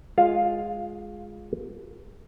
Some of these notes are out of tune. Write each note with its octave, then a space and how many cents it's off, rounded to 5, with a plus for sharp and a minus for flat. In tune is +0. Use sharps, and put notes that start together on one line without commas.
G#3 +0 F4 +10 F5 +0